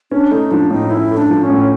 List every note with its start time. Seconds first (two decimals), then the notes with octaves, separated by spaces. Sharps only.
0.11 C#4 D4
0.31 A3 D#4
0.51 F3 D4
0.70 A2 D#4
0.91 C#4 E4
1.11 A3
1.17 D4
1.30 F3
1.43 C#4
1.50 A2